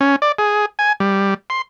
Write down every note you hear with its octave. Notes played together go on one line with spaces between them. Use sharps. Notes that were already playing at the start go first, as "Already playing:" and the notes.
C#4
D5
G#4
G#5
G3
C6